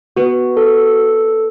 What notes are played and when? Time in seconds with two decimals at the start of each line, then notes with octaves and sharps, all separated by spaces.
0.16 B3 F#4
0.57 A4